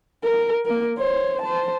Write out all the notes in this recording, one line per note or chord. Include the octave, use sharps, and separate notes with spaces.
A#4
A#3 A#4
C5 C#5
C5 A5